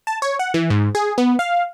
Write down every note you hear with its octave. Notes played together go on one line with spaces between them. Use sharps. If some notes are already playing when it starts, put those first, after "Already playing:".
A5
C#5
F#5
E3
G#2
G#4
B3
F5